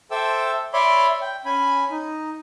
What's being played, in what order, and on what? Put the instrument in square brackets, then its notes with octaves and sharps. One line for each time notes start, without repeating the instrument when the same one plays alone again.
[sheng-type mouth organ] A4 C5 E5 G5 D6 E6
C#5 D5 E5 B5 C6 D6
G5
C#4 G#5 B5
D#4